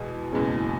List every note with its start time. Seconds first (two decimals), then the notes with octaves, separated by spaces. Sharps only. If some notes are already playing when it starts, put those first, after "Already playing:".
Already playing: E2 B2 G#3
0.32 F#1 E2 B2 G#3 C#4